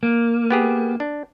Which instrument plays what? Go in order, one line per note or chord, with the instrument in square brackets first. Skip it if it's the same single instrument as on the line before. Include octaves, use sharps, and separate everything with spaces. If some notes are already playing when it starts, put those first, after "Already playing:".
[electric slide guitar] A#3
[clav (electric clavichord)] B3 G4 G#4
D4